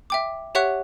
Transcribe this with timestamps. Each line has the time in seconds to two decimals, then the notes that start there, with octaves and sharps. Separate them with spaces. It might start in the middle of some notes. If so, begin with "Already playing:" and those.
0.10 E5 G5 D6
0.55 G4 C#5 E5 F#5 C#6 F#6